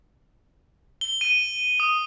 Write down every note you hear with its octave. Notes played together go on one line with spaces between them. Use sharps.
G7
D#7
D#6